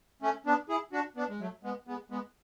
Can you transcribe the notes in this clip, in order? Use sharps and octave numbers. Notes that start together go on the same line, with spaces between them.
A3 C#4
B3 D4
E4 G#4
D4 F#4
B3 D4
G#3
F#3 A3
G#3 B3
G#3 B3
G#3 B3